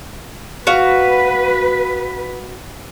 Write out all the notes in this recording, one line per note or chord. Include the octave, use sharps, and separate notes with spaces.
F#4 B4 F5